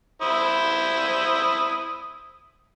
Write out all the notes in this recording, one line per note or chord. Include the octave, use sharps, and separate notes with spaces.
E4 C5 D#6